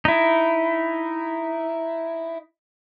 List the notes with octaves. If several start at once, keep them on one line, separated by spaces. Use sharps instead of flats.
D#4 E4